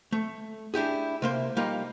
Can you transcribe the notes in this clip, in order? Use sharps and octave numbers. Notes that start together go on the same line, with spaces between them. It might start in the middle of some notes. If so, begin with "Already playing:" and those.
A3
D4 E4 G4 G#4
C3 A#3 C5
G3 A#3 D#4 F4